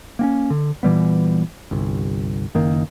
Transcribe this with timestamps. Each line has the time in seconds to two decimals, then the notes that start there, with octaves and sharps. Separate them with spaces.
0.19 A#3 C4 C#4
0.50 D3
0.83 A#2 E3 G3 B3
1.71 G1 C2
2.55 F#1 D#3 A#3